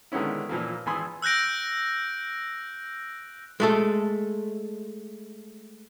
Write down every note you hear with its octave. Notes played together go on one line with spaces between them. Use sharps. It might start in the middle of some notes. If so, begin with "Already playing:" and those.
D3 D#3 G#3 B3 C#4 E4
A#2 E3 F3 A#3
G#1 E3 G#5 B5 C6 D#6
E6 F#6 G6 A#6 D7
G#3 A3 A4